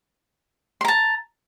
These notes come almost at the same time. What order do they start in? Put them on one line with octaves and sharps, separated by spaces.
C6 A#5 A5